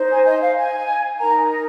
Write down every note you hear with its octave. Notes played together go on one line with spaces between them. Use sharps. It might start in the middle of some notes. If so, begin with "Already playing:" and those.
Already playing: D#4 C5
G#5
D#5
F5
G#5
D#4 A#4 A#5